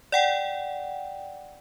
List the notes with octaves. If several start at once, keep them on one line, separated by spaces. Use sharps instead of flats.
D5 F#5 G5